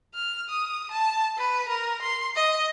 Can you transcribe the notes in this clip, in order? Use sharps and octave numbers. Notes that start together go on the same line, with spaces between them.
F6
D#6
A5
B4
A#4
C6
D#5